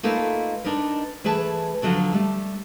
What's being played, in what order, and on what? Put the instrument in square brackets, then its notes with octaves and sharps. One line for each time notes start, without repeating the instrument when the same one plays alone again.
[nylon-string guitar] A3 A#3 D#4 F4 A4 B4
D4 D#4 A#4 B4
E3 A3 G#4 B4 A5
D3 F3 F#3 F#4 A4
G3 A3